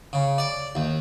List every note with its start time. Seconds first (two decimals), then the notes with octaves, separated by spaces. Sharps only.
0.13 C#3
0.38 D5
0.75 D#2